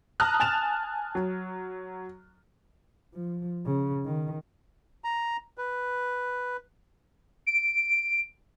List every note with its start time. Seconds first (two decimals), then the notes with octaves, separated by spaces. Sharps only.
0.20 A5 A#5 D#6 F6 F#6
0.40 G#5 A5 A6 E7 F7
1.15 F#3
3.14 F3
3.66 C#3
4.05 D#3
5.04 A#5
5.58 B4
7.47 D7